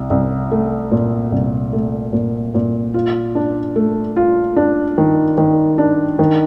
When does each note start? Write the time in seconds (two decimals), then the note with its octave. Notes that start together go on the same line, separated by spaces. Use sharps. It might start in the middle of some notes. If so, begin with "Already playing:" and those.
Already playing: C2
0.10 C2
0.51 A3
0.91 A#2
1.32 C2
1.73 A3
2.13 A#2
2.54 A#2
2.94 F4
3.35 D4
3.76 A3
4.16 F4
4.56 D4
4.98 D#3
5.38 D#3
5.78 D4
6.19 D#3